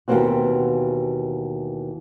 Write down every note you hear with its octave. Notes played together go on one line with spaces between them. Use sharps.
D#2 B2 E3 A#3 C4 F#4